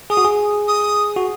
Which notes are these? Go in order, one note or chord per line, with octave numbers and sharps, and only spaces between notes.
G#4 D#6
F#4
G#4
D#6
F#4